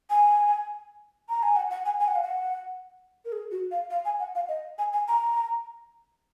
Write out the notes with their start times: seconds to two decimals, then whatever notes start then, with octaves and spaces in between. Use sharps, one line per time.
0.10 G#5
1.29 A#5
1.43 G#5
1.56 F#5
1.71 F#5
1.86 G#5
2.00 G#5
2.08 F#5
2.15 F5
2.23 F#5
3.25 A#4
3.32 G#4
3.51 F#4
3.71 F5
3.90 F5
4.05 G#5
4.20 F#5
4.35 F5
4.49 D#5
4.78 G#5
4.93 G#5
5.08 A#5